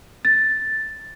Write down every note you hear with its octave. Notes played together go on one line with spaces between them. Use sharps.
A6